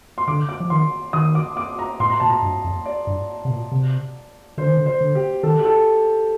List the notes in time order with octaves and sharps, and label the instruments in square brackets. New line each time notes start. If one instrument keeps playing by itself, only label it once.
[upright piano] C6
[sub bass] D3 [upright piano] D6
[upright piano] D6
[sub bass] F3
[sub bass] D#3 [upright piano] C6
[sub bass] D#3 [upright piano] D#6
[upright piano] D6
D6
A#5
[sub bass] A2 [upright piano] C6
[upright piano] A#5
[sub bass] A#2 [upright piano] A5
[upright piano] A#5
[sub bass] G2
F2
[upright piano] D5
[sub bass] G2
C3
A#2
C3
[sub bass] D3 [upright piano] C5
[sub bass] D#3
D3
[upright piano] C5
[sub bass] D3
[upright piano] G4
[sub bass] D#3 [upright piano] A4
[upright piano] G4
A4